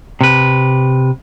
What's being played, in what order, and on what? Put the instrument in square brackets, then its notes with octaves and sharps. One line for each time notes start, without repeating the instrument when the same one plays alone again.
[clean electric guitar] C3 B4